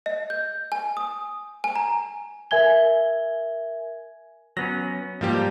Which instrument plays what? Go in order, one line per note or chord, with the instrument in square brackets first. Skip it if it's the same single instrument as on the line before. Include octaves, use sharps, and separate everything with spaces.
[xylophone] D#5
G6
G#5
D#6
G#5
A#5
[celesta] A#4 E5 G#5 G#6 G7
[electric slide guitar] F#3 B3 C#4 [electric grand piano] A#6
[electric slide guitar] G#2 G3 [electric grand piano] F3 A#3 G4